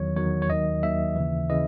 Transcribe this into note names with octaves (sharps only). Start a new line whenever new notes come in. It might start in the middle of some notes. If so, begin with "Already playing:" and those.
Already playing: E2 D#3 F#3 C#5
E2 D#3 F#3 C#5
C#5
D#2 D#3 F#3 D#5
D#2 D#3 F#3 E5
D#2 C#3 E3
C#3 E3 D#5